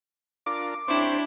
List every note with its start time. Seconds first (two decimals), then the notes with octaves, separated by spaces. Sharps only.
0.46 D4 F4 A#4 D6
0.88 C4 D4 E4 G4 C5 C#5